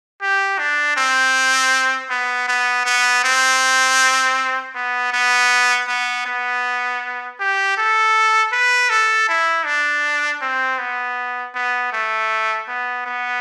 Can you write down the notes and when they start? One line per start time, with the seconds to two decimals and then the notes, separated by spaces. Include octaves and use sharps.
0.22 G4
0.59 D4
0.97 C4
2.10 B3
2.48 B3
2.86 B3
3.24 C4
4.75 B3
5.13 B3
5.88 B3
6.26 B3
7.40 G4
7.78 A4
8.53 B4
8.90 A4
9.29 E4
9.66 D4
10.42 C4
10.79 B3
11.55 B3
11.93 A3
12.69 B3
13.06 B3